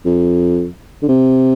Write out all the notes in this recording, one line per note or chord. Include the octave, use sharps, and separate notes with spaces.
F2
D3
C3